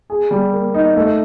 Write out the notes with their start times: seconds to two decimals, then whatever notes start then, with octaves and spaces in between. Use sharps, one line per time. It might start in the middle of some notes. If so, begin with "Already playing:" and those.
0.10 G#4
0.31 G3
0.53 A#3
0.74 D#4
0.96 A3